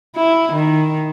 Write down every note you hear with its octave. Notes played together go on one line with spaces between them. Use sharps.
E4
D#3